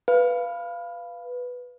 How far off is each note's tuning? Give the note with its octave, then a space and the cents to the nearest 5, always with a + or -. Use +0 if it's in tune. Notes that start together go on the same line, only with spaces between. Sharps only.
B4 +0 F5 -15